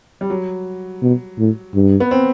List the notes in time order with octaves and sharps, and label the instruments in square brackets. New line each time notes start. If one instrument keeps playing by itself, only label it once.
[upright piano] G3
F#3
[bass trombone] B2
A2
G2
[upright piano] B3
C4